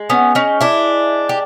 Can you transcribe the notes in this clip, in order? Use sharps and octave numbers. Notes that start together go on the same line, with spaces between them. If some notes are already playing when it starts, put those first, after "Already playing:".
Already playing: G#3
B3 C#4
C#4 D#4
D4 E4
G4